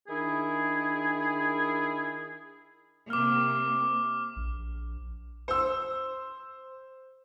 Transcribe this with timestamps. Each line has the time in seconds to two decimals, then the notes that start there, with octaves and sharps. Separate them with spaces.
0.08 D#3 D4 E4 G#4
3.10 C3 A#3 D6 F6
4.36 A#1
5.48 C5 E6